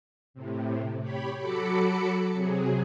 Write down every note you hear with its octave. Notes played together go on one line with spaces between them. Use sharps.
A2 C3
G4 C#5 B5
F#3 F#4 A4 B5 D6 C#7
C3 F#3 G#4